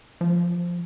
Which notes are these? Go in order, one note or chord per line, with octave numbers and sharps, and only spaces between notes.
F3